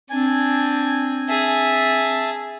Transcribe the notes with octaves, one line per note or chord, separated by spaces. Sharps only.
C4 D4 G#5
G#4 E5 A5